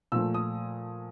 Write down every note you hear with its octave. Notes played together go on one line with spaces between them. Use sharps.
A#2 F3 A3 E6
D#6